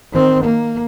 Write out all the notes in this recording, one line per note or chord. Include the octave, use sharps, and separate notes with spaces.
D#3 C4
A#3